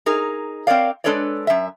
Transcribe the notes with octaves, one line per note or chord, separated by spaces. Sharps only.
D#4 G#4 A#4
C4 A#4 C#5 D5 F5
G#3 D4 A4 B4 C#5 D5
F#2 E5